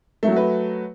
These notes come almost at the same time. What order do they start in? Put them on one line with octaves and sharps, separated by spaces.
A3 F#3 F#4 B4